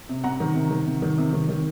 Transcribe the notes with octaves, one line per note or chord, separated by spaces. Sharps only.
C3
C3 F#5 A#5
D#3
C3
D#3
C3
D#3
C3
D#3
D#3